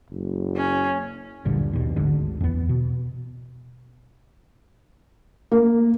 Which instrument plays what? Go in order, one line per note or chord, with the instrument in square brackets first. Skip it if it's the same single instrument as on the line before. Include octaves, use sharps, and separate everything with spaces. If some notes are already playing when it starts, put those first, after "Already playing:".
[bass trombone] F#1
[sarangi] C#4
[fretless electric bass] D#1 A#1 G2 D3
D#2 B2
G#1 D2 G#2 D3
E2 B3
B2
[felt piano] A#3